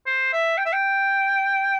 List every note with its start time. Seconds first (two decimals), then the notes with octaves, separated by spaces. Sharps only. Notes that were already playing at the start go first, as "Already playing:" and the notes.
0.07 C5
0.33 E5
0.58 G5
0.65 E5
0.73 G5